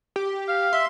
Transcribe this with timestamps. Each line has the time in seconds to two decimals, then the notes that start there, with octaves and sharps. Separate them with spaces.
0.16 G4
0.48 F5
0.73 E5 C6